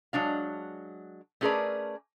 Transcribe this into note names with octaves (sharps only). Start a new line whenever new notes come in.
F#3 G#3 D4 F5
A3 C#4 G#4 A#4 B4 D5